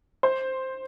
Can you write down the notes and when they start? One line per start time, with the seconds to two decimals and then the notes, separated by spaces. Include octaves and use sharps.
0.23 C5